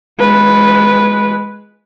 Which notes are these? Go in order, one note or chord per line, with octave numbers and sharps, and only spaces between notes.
G#3 B4